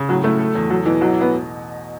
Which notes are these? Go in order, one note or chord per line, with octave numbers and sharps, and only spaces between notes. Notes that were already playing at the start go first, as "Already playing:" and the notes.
Already playing: C#3
A2 F#3
A2 A3
A4
E2
F#3 A4
B2 E3
A1 F#3
B3